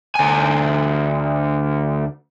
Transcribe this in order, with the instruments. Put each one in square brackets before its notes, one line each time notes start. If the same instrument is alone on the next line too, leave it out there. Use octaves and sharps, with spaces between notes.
[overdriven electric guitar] D2 G#5